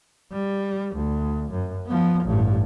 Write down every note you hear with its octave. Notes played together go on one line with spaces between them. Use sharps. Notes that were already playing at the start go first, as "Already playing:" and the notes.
G3
D2
F#2
F3 B3
A1 G2